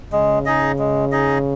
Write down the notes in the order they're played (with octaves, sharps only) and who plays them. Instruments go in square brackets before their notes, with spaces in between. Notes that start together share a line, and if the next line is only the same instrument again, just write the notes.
[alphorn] C#3 [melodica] G#3
[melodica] D#4 G#4 D#5
G#3
D#4 G#4 D#5